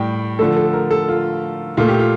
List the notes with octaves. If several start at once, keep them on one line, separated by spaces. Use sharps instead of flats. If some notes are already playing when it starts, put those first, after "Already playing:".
Already playing: A2 G3 G5
D3 F3 A3 A4
A4
A#4
A4
F4
A#2 A3 F4
G4
F4